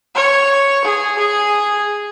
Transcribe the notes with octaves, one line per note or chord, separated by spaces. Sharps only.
C#5
G#4
G#4